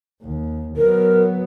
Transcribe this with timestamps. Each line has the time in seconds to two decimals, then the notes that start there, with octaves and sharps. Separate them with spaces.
0.22 D#2
0.77 F#3 B3 A#4